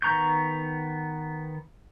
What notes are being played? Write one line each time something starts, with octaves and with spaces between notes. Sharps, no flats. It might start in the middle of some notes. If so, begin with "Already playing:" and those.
D#3 B3 A#5 C#6 G6